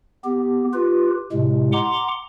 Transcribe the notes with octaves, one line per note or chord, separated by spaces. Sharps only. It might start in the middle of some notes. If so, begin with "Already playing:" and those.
B3 G4
F4 G4 B4
A2 C3 G#3
F#5 A#5 C6 D6